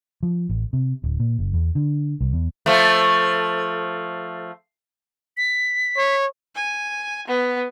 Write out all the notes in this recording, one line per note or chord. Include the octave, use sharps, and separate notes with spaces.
F3
A1
C3
D1
A#2
F#1
E2
D3
C2
E2
F3 A3
B6
C#5
G#5
B3